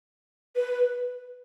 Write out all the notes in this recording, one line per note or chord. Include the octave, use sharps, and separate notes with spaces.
B4